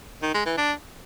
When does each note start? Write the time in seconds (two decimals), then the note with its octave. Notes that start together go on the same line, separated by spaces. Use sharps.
0.22 D#3
0.34 G#3
0.46 E3
0.58 D4